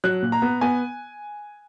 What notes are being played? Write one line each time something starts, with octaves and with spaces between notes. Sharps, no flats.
F#3 F#6
A#2
A#5
B3
B3 G#5